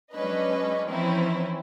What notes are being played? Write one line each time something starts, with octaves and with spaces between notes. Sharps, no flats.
F#3 G#3 C#4 D4 B4 D#5
E3 F3 C4 C#4 D#4 E4